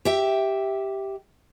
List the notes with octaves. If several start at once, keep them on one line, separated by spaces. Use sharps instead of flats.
G4 E5 G5